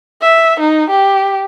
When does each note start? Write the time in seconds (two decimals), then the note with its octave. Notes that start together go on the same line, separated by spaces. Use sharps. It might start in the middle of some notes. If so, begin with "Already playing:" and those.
0.22 E5
0.60 D#4
0.90 G4